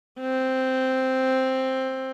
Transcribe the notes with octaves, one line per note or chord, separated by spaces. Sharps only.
C4